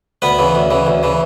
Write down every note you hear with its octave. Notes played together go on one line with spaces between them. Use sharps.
D2 B3 B4
C#3 E3
D2
C#3 E3
D2
C#3 E3